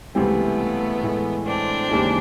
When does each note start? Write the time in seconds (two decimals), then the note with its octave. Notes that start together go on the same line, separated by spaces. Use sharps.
0.15 C#2 C3 E3 G3 A3 B3 C4
1.02 A2 E3 G#3
1.46 C4 D4
1.89 D#2 C#3 E3 G#3